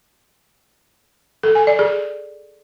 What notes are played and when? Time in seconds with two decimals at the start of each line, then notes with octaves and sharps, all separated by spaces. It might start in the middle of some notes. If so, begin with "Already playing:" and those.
1.43 A4
1.55 G#5
1.67 D5
1.79 G#4